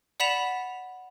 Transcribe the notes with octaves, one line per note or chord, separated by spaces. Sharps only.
D5 F#5 B5 B6 E7 F7